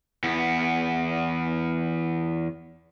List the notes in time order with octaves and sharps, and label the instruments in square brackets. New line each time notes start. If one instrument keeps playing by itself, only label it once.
[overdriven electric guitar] E2 B3